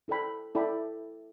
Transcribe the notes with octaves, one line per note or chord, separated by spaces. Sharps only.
E4 A4 D5 G5 B5
E4 A4 D5 G5 B5